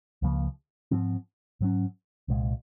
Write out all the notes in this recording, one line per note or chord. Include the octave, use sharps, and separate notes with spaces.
C#2 C#3 F3 A#3
G#2 F3 C4
G#2 F#3 C#4
C2 A#2 G#3